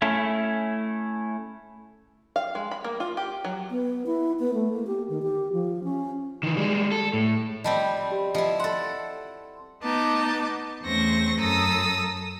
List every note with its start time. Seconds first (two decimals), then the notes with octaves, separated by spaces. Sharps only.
0.02 A3 C#4 E4 A4
2.36 F5
2.55 G#3
2.71 B5
2.84 A#3
3.00 F4
3.17 G4
3.45 F#3
3.69 B3
4.06 E4
4.39 B3
4.54 A3
4.73 A#3
4.87 G4
5.09 D#3
5.23 G4
5.53 F3
5.84 C#4
6.43 D#3 E3
6.57 G3 G#3
6.92 A4
7.14 A2
7.64 F3 G3 C4 D#5 A5 B5
8.11 G4
8.35 F3 E4 D#5
8.60 A4 F#5 C6
9.83 B3 D#4 A5 D6
10.82 E2 A3 C4 C#4 C#6 A#6
11.38 F#2 A4 A#5 D#6 E6